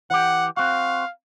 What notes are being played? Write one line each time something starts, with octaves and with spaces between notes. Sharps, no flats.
E3 G4 F#5
C4 F#4 F5